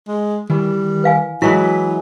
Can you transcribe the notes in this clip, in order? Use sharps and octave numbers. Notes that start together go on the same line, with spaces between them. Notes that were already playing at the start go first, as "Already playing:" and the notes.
G#3
D#3 E3 G3
B4 F5 G#5
E3 F#3 G#3 E4 B4 B6